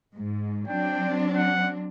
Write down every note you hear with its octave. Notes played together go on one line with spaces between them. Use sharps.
G#2
F#3 C4 D4 G5
F#5